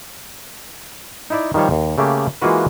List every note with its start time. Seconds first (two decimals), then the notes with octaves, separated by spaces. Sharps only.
1.30 D#4 E4 D5
1.54 D#3 F3 G3 C5 C#5
1.71 D#2
1.98 C#3 A3 A#3 G4
2.41 E3 G#3 A#3 F4 F#4 B4